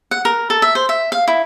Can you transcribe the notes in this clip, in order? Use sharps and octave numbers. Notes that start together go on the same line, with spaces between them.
F#5
A#4
A4
E5
C5
E5
F5
E4